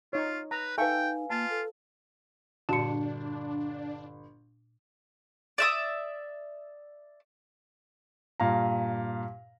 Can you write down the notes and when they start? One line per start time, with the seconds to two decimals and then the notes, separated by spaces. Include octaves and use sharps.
0.13 D#4 F4 C#5
0.51 B4 A#5
0.78 D#4 A4 B4 E5 F5 G5 G#5 C#6
1.30 A#3 F4 A5
1.50 A4
2.69 G1 A#2 D4 F#4 A5 C#7
5.58 D5 E5 D#6
8.40 G2 A#2 F5 A#5